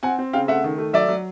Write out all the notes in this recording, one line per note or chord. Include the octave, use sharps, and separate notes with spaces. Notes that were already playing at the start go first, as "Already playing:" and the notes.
C4 F#5 G#5
C4
C#3 F5 G5
A3 E5 F#5
D#3
A3
F#3 D5 E5
F#3